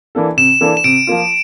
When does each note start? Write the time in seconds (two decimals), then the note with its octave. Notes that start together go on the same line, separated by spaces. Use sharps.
0.15 E3 A#3 D4 A4
0.37 C3 E7
0.61 E3 A#3 D4 A4
0.77 E7
0.84 C3 D7
1.07 F3 A#3 F4